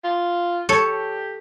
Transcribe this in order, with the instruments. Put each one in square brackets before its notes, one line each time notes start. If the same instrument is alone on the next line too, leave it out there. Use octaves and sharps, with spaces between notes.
[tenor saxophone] F4
[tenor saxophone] G4 [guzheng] A4 C#5